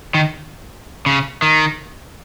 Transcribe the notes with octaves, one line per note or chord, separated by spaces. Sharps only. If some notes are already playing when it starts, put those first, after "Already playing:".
D#3
C#3
D#3